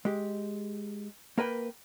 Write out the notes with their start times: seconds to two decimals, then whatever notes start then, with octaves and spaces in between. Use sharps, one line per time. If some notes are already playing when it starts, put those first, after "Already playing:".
0.05 G#3 G4
1.38 A#3 A#4 B4 G5